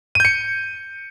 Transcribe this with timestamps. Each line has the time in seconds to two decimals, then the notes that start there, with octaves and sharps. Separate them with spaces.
0.15 D#7
0.20 G6
0.25 C#7